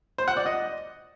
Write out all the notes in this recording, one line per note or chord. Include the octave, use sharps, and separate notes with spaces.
C5
F#5
D5
D#5